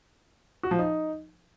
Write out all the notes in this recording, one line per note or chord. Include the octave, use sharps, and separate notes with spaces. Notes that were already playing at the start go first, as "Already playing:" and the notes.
F#4
F3
D#4